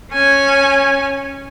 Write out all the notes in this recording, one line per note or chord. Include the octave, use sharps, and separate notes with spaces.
C#4 G#5